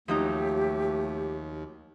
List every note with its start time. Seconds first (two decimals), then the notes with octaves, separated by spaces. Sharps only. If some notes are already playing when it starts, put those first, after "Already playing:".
0.08 D#2 F3 F#3 A3 D#4 G4